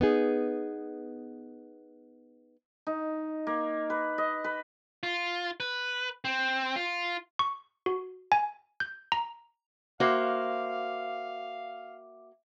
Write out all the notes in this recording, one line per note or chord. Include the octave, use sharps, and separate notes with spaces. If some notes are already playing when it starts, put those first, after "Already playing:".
B3 D#4 G#4
D#4
A#3
B4
D#5
B4
F4
B4
C4
F4
C#6
F#4
G#5
G6
A#5
A#3 F#4 C5 E5 F5 D6